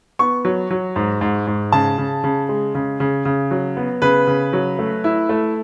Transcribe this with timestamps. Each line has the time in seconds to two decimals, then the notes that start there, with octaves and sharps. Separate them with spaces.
0.19 B3 C#6
0.45 F#3
0.70 F#3
0.96 G#2
1.21 G#2
1.47 G#2
1.72 C#3 A5
1.98 C#3
2.24 C#3
2.49 G#3
2.75 C#3
3.00 C#3
3.25 C#3
3.51 F#3
3.77 B3
4.02 C#3 B4
4.27 C#3
4.53 F#3
4.79 A3
5.04 E4
5.29 A3